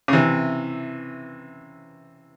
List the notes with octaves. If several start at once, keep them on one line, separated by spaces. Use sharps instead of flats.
C#3
C3 E3